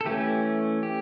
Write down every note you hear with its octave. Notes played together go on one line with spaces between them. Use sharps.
A4
E3 A3 C#4 G4
G4